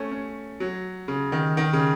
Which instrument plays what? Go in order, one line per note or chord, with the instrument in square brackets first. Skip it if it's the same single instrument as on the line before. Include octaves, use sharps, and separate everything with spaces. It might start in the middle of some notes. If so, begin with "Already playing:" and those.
Already playing: [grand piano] A3 C#4
C#4
F#3
C#3
D#3
D#3
C#3